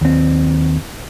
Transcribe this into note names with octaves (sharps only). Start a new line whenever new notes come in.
D#2 C4